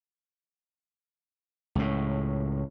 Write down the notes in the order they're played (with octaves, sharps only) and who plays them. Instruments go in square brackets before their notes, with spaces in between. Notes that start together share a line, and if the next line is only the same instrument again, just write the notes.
[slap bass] C#2 A2